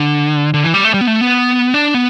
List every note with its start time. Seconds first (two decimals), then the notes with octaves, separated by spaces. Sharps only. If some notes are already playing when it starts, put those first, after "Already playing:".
Already playing: D3
0.54 D3
0.63 E3
0.74 G3
0.85 A3
0.94 G3
1.01 B3
1.07 A3
1.21 B3
1.74 D4
1.94 B3